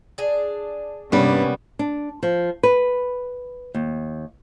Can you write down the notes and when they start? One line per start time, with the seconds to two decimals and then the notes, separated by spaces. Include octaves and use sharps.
0.18 D4 G#4
1.12 G2 C3 G3 A#3 B3 C#4
1.79 D4
2.23 F3
2.63 B4
3.75 D#2